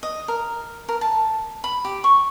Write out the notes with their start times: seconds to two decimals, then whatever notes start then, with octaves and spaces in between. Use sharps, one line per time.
0.03 D#5
0.28 A#4
0.89 A#4
1.01 A5
1.64 B5
1.85 G4
2.04 C#6